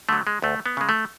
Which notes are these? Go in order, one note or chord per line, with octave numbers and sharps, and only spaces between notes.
D3 F#3 A3
G#3
D2 A3
B3
C#3 G#3
A3